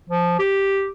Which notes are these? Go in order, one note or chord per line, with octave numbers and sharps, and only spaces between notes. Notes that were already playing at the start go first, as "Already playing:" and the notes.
F3
G4